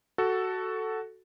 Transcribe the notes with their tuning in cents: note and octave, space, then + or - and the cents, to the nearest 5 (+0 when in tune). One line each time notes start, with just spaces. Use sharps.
F#4 +10 A4 +0